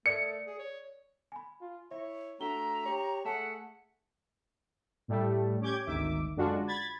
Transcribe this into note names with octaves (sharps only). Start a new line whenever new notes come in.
A3 A#4 D5 D#6 C#7
G#4
C#5
G#5 B5
F4
E4 C#5 E5
A3 D4 F#4 A#5 G7
G4 C#5
A3 G#4 F#5 A5
A2 G3 A3
C#4 G4 D6 G6 G#6
G#1 D2 D#3 E5 D6
F#2 D3 G#3 D4 F4 F#4
B5 G#6 A6